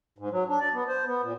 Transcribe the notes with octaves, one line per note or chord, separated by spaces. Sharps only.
G#2
F#3
D4
D5
B3
C5
B3
A#2